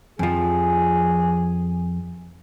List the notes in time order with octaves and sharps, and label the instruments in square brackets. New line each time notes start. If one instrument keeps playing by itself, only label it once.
[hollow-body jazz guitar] F2 F3 [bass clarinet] G#4